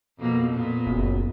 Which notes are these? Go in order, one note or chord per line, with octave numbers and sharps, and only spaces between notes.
F2 B2 A#3
A#2 B3
F#1